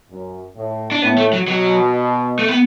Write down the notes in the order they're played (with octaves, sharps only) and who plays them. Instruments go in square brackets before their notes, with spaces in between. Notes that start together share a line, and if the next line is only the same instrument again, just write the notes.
[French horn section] F#2
A2
[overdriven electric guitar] D4
[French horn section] A2 [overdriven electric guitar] B3
[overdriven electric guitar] A3
F#3
[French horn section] B2 [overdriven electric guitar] F#3
[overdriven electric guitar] A3
B3